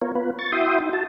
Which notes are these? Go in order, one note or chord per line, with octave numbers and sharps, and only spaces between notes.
B3 F4 A#4 C#5
B3 F4 B4
C#6 A6
E4 F#4 E5 G5 C6 D#6
D#4
F#4 A5